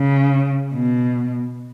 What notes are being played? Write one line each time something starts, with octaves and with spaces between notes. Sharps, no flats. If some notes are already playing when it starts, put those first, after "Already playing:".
Already playing: C#3
B2